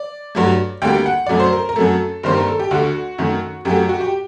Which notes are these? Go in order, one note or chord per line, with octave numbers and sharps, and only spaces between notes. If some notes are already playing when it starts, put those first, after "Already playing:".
Already playing: D5
G2 F#3 A3
D2 D3 G3 A#3 G5
F#5
F#2 F#3 A3 D5
C5
A#4
A#4
F#2 F#3 A3 A4
G2 D#3 G3 A#3 C5
A#4
A4
G4
D2 D3 A3 F#4
F#2 D#3 A3
F#2 F#3 A3 G4
F#4
G4